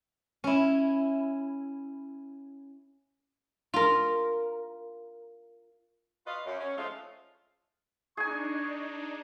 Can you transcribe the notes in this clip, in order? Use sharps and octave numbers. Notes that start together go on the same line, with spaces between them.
C#4 E4
F4 A#4
F4 F#4 B4 D#5 F5
F#2
C#4
F3 G#3 A3 C4 D#4 F4
D4 D#4 G#4 G#5 C#6